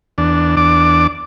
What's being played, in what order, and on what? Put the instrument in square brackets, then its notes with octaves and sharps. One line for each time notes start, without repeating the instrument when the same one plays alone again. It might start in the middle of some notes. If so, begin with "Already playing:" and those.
[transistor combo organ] E2 D4
E2 D4 D6